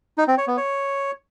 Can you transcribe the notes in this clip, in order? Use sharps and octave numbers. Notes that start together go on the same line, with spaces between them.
D#4
C4
C#5
B3
C#5